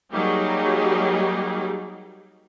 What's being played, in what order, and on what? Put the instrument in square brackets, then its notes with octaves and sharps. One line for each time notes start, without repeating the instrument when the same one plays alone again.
[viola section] F#3 G3 A#3 D#4 G4 G#4